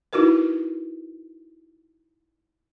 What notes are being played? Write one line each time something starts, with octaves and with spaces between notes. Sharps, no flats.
D#4 E4 F#4 A#4 B4